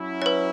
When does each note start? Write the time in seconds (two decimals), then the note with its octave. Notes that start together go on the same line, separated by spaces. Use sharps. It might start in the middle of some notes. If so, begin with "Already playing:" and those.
Already playing: F#3 C#4 E4
0.22 C#5
0.26 B4